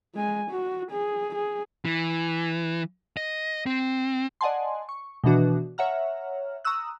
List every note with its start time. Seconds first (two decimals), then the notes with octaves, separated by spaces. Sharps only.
0.15 G#3 G#5
0.51 F#4
0.91 G#4
1.35 G#4
1.85 E3
3.17 D#5
3.66 C4
4.41 D5 D#5 F#5 G#5 A5 C6
4.89 C#6
5.24 B2 D#3 E3 D4 F#4
5.78 C#5 E5 F#5 A#5 F6
6.65 A#5 C#6 D#6 E6 F#6